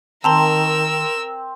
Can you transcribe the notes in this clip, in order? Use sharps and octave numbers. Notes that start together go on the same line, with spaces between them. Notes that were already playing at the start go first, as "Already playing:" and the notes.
D#3 C4 A#4 A5 A#5 C6 E6